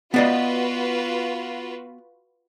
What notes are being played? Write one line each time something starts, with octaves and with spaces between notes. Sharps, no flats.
B3 F4 F#4 B4 D5 D#5